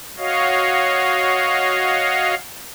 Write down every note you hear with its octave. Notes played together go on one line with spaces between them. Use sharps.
F#4 C#5 D#5 F5